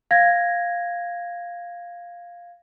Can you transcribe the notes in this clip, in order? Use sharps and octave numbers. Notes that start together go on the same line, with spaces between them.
F5 G#6 A#6